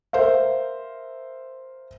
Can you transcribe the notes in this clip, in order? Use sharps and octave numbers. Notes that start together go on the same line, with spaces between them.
A#4 C5 E5 F5